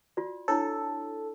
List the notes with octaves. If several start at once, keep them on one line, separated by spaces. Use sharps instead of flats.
F4 F#4 D5
D4 E4 A4 C#5